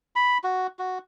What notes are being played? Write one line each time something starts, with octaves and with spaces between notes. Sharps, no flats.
B5
F#4
F#4